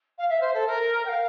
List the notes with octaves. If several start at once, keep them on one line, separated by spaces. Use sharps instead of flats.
F5
E5
C5
A4
A#4
G5
F5